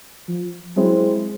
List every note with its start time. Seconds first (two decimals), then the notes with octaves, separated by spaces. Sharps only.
0.28 F3
0.76 F#3 G#3 C4 E4 G#4 C5